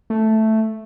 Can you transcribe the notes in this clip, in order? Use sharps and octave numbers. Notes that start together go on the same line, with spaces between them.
A3